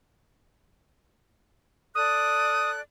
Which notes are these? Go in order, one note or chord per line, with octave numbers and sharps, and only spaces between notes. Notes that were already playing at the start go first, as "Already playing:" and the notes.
A4 D5 D#6 F#6